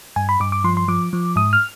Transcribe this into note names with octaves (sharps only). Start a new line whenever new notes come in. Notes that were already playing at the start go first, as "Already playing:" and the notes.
G2 G#5
B5
G2 D6
D6
F3 C6
C6
F3 D6
F3
G#2 D#6
F6